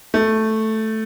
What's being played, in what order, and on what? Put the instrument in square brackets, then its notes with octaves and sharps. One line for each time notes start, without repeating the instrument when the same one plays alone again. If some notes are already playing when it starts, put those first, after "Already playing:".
[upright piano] A3